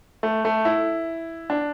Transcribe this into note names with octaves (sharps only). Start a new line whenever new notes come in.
A3
A3
E4
D4